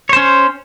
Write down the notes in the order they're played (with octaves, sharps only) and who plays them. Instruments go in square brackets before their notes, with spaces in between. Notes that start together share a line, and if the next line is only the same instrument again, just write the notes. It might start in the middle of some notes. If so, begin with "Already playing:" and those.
[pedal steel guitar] C#5
C5
C#4